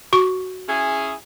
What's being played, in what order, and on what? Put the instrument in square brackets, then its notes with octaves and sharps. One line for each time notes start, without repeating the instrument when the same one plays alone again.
[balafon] F#4 C#6
[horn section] C#4 E4 G#4